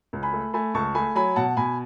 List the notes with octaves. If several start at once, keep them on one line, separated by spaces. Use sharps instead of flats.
C#2
G#5 B5
A3
A3 G#5 B5
C#2 A5 C#6
A3 G#5 B5
F#3 G#5 B5
B2 F#5 A5
B2 G#5 B5